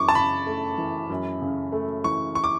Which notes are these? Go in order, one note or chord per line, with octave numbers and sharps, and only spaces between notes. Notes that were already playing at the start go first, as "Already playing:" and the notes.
Already playing: F#2 E3 C#6 D6
A5
C#3 B5
A3
E3
F#2
C#3
A3
E3 C#6
C#6
D6